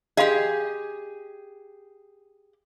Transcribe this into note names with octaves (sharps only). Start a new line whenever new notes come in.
G4 G#4 D#5 F5 C6